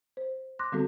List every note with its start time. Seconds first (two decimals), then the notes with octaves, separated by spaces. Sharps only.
0.17 C5
0.59 C6 D6 F#6 A#6
0.72 D3 G3 B3 C4 F#4 A4